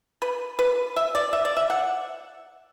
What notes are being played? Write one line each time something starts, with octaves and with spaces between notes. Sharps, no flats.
B4
B4
E5
D5
E5
D5
E5
F#5